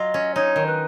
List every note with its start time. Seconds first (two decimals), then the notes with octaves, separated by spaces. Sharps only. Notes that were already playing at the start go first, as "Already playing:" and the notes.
Already playing: F#3 F4 D#5
0.14 C#4
0.35 D#4 C#5
0.56 D#3
0.66 B4